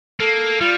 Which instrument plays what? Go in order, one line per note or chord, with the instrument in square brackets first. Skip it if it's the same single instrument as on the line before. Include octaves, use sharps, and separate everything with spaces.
[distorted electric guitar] A#3 [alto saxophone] A4
[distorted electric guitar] G3 [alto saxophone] F4